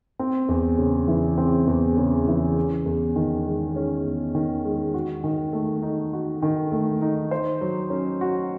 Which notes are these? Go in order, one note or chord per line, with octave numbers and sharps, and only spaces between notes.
C4
E2
C#3
E3
C4
E2
C#3
E3
C#4
E2
D#3
G#3
C#4
E2
D#3
G#3
F#4
D#3
A3
D#4
F#4
D#3
A3
D#4
C5
F#3
C#4
F#4